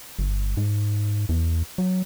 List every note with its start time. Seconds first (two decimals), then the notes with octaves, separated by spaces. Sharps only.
0.19 G1
0.57 G#2
1.29 E2
1.78 F#3